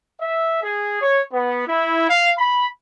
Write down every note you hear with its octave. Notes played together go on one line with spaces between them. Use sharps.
E5
G#4
C#5
B3
E4
F5
B5